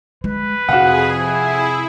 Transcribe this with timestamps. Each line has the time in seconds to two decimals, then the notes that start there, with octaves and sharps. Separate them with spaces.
0.24 G#3 B4
0.69 F2 C3 F#4 G#4 F5 F#5
1.11 E4 G#4